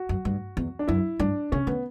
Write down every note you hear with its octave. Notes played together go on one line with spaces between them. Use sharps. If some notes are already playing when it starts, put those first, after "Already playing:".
Already playing: F#4
F#2
G2
E2
D4
F#2 E4
G2 D4
C#3 C#4
D3 B3